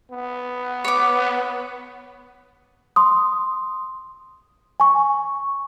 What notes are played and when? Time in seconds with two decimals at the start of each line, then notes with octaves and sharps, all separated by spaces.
0.12 B3
0.85 C#5 D6
2.96 C6 D#6
4.80 G#5 C#6